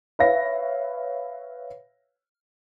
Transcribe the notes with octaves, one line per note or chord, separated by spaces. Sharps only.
B4 C#5 E5 F5 A#6